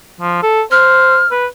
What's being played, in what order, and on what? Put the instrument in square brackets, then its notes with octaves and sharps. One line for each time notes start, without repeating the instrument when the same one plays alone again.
[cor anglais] F3
A4
[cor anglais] C5 [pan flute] F6
[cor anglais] B4